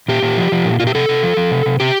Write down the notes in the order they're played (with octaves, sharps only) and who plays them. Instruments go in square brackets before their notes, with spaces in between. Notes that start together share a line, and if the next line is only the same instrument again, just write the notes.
[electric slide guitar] A#2 G4
A#2
F3
F3
A#2
A#2 F4
G4
C3 A4
C3
F3
F3
C3
C3
C3 G4